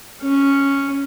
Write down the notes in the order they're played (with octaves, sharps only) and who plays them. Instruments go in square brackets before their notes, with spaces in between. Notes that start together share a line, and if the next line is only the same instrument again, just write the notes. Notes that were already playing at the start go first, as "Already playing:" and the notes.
[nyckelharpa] C#4